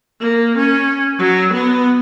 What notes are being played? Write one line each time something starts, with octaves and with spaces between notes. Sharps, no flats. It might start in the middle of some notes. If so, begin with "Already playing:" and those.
A#3
C#4
F#3
B3